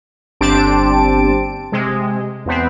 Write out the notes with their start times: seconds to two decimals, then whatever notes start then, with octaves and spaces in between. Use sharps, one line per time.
0.41 G1 C4 D4 G4 A5 D7
1.72 C3 G#3
2.46 E2 B3 C4